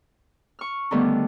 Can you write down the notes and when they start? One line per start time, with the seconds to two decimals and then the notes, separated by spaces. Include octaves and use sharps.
0.59 C#6 F6
0.91 D3 D#3 G3 A3 B3